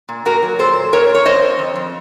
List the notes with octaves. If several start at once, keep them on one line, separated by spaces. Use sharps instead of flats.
A#2
A#2 F#4 A#4
F#3
A#2 A4 C5
A#2
A#2 A#4 C#5
A#2
C#5
F2 C5 D#5
F2
F2
F2